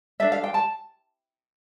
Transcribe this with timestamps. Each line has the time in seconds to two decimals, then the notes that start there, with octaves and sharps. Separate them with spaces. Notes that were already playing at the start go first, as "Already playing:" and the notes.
0.20 D4 A4 E5
0.32 F5
0.44 G5
0.54 A5